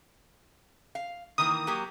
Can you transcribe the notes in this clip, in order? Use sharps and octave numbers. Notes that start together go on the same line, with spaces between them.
F5
D#3 E3 A#3 D#6
F#3 A#3 G4